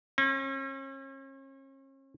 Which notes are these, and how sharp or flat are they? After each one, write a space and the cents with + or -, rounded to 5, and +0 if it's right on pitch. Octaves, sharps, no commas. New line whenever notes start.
C#4 -40